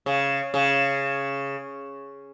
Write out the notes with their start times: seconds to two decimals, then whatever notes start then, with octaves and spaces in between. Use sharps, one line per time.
0.06 C#3
0.54 C#3